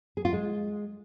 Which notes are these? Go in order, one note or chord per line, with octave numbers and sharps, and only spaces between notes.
G#4
F4
G#3